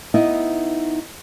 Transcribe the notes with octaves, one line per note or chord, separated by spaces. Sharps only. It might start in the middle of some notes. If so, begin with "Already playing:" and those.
B3 D#4 E4 D#5